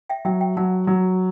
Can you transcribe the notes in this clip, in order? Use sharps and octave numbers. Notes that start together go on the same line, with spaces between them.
E5 G5
F#3 E5 G5
E5 G5
F#3 F#5 A5
F#3